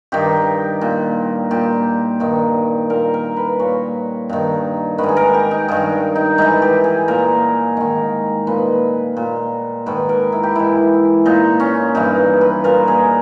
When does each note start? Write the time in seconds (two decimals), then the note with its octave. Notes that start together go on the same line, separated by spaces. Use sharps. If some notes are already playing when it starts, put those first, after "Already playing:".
0.12 G2 D#3 G4
0.81 A#2
1.51 A#2 G4
2.20 G2 D#3
2.89 A#2 A#4
3.14 A#4
3.37 B4
3.59 A#2 C#5
4.29 G2 D#3
4.98 D#3 B4
5.04 G#2
5.09 G#4
5.17 A#4
5.34 G4
5.51 D#4
5.68 G2 D#3 D#4
6.15 D#4
6.38 G#2 E3 D#4
6.62 G4
6.84 G#4
7.08 A#2 A#4
7.77 G#2 D#3
8.47 A#2 B4
9.17 A#2
9.86 G#2 D#3 B4
10.09 A#4
10.32 E4
10.43 G4
10.55 G#2 E3 E4
11.25 A#2 D#4
11.60 C#4
11.95 G2 E3 D#4
12.41 B4
12.64 A#2 A#4
12.88 G#4